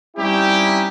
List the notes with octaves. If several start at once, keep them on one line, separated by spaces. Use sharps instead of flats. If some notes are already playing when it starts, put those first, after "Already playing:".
G3 C4 C#4 D#4 E4 G4